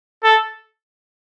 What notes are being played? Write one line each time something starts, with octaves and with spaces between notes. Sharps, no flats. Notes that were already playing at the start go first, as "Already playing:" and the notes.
A4